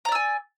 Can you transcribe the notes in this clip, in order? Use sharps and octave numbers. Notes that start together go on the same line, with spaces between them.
D5 G#5 A#5 E6